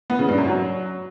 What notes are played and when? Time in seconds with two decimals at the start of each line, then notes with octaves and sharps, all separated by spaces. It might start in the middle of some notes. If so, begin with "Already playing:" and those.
0.10 B3
0.19 C#3
0.28 G2
0.38 F#2
0.47 F#3